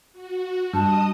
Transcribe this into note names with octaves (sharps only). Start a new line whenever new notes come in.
F#4
G2 D#5 A5 D#6